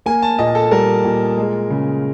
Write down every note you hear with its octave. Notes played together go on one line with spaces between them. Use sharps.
A#3 G#5
A5
A#2 D#5
A4
G3 A#4
A#2
G#3
C#3